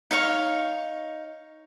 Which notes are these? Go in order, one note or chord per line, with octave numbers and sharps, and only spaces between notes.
D#4 C#5 F5 C#6